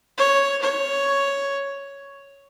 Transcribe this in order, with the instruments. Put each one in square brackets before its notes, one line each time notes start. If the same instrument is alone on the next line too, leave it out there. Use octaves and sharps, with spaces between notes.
[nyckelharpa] C#5
C#5